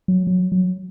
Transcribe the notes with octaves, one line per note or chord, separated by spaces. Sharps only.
F#3
F#3
F#3